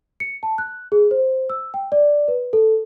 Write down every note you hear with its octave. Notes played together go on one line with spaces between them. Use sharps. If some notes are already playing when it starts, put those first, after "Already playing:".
C#7
A5
F#6
G#4
C5
E6
G5
D5
B4
A4